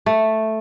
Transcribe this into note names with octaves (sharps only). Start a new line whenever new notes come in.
A3